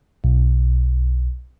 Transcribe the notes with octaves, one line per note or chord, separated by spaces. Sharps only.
B1